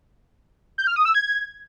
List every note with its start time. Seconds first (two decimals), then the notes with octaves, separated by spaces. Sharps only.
0.78 G6
0.87 F6
0.96 D#6
1.05 E6
1.14 G#6